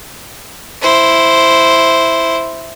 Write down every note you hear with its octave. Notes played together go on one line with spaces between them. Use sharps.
E4 C5